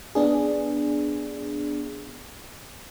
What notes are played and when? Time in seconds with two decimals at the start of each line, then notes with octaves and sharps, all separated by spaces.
0.15 B3 D4 G#4